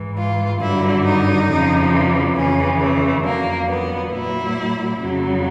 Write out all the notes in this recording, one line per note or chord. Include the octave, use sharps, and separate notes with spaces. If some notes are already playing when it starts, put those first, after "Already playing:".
Already playing: G#2 E3
F4
G2 D3 F#3 E4
D#4
F2 C#3 F3
F2 C#3 E3 C#4
A3
F2 D3 F#3 A#3
B3
A#2 F#3 E4
F2 C#3 F#3